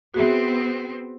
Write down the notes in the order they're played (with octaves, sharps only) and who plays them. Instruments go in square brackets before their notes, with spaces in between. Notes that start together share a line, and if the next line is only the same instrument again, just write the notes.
[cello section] B3 C4 [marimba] F#4 G#4 E5